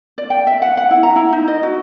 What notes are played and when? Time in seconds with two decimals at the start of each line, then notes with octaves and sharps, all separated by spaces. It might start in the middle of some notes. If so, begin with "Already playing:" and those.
0.18 D5
0.30 G5
0.47 E5
0.62 F#5
0.77 F#5
0.91 E4
1.03 A#5
1.16 E4
1.32 D#4
1.48 D#5
1.63 F#4